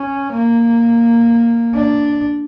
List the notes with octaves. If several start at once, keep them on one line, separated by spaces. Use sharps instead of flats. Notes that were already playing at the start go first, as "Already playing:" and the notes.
Already playing: C#4
A#3
D4